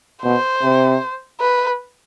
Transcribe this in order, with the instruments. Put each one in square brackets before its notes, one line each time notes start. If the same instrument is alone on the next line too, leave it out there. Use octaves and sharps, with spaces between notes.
[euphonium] B2 [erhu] C5
[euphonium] C3
[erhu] B4